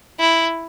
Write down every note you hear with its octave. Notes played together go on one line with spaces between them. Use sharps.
E4